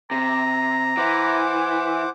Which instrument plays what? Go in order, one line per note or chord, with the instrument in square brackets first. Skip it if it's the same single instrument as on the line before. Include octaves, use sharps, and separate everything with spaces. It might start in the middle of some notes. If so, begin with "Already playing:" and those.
[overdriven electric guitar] C3 [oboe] A#5
[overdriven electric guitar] E3 [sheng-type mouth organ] C5 F#5 D6